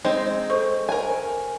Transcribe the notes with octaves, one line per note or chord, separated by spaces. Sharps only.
G#3 C4 D#4
A4 C5 C#6
A#4 G#5